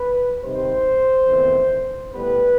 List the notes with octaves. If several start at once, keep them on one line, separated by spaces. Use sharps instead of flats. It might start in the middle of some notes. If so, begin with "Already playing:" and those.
Already playing: B4
C3 D#3 G3 C5
E2 D#3 A3 C4
A2 G3 B3 B4